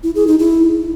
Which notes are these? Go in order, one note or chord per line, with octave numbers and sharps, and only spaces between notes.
E4
G#4
D#4
E4